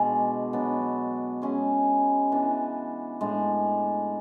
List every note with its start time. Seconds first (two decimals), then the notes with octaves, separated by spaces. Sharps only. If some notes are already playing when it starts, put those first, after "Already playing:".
Already playing: B2 G#3 D4 G#4
0.53 F#3 B3 D4
1.42 G#3 C#4 G#4
2.32 E3 B3 D4
3.21 A2 G#3 D4